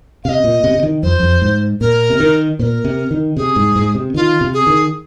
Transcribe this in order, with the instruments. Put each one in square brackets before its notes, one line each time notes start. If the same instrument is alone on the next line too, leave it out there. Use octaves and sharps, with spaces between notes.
[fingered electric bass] C3 [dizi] D#5 F5
[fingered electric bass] A#2
C3
C3
D#3
[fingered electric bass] F2 [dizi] C5
[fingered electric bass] F2
G#2
[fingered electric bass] A#2 [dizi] A#4
[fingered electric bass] C3
D#3
[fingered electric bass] A#2 [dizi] A#4 C5
[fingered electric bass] C3
D#3
[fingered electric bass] C3 [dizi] G#4
[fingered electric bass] G#2
G#2
C3
[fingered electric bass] D#3 [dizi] F4
[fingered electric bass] C3
[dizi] G#4
[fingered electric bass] D#3